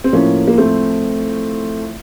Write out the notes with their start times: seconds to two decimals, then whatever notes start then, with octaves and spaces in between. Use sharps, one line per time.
0.04 C4
0.13 A2 F3 A#3 C#4
0.48 A#3
0.58 A3 C4